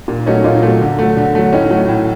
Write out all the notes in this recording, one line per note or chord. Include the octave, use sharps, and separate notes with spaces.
A#2
F#3 A3 C#4 D#4
A#2 D#4 F4
F#3 A3
D3
F#3 A3
D3
F#3 A3
A2 C#4 D#4
F#3 A3
A2